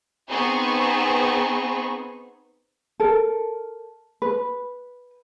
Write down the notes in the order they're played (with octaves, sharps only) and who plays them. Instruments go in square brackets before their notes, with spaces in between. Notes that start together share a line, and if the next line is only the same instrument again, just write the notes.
[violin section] B3 C4 D#4 G#4 C#6
[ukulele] A4 A#4
B4